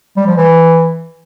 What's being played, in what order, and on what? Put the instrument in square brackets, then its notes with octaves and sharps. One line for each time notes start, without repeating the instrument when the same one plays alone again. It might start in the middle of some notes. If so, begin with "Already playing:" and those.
[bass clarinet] G3
F3
E3